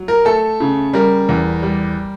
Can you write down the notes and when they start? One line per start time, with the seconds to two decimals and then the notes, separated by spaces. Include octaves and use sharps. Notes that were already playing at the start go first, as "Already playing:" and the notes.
Already playing: F#3
0.08 A#4
0.25 A3 A4
0.60 C#3
0.93 G3 A#4
1.29 E2
1.63 G3